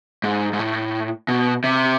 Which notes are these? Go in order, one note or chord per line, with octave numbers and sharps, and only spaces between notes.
G#2
G#2
A2
B2
C3